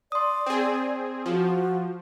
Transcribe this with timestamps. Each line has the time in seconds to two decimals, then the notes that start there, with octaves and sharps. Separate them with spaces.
0.12 D5 C6 D#6
0.46 C4 G#4
1.26 F3 F#4